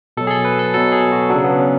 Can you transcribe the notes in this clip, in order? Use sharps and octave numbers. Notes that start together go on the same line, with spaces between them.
B2 F#3 A4
G#4
A4
B4
A4
B2 F#3 A4
G#4
F#4
C#3 F#3 D4
B3
C#4